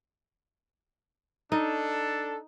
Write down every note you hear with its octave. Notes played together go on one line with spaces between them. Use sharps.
D4 D#4 A4